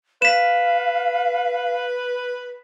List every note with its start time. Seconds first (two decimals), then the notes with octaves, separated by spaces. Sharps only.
0.22 B4 F5 B6 E7